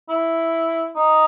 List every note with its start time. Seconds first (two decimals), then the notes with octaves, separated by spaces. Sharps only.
0.09 E4
0.95 D#4